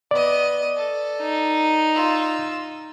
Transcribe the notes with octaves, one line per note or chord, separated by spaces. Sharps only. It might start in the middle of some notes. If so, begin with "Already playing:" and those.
B3 D5 D#5
A4
D#4
F4 E6